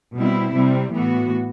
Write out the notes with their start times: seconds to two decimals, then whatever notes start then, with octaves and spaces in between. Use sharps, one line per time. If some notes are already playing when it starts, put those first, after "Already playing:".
0.16 B2 G3 C4 E4
0.54 C3 G3 C4
0.93 A2 E3 B3 F#4